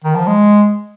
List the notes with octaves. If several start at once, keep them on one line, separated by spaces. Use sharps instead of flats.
D#3
F3
G#3